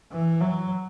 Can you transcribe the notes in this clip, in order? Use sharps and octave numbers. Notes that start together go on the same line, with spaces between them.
E3
F#3